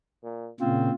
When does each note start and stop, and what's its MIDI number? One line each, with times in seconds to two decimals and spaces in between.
0.23 0.50 46
0.60 0.90 46
0.60 0.90 49
0.60 0.92 60
0.60 0.95 65